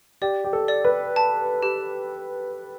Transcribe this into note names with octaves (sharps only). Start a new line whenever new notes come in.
G4 D5
G4
A4
D5
B4
A5
G4